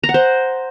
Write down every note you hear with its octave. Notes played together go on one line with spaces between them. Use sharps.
A#5
F#5
C5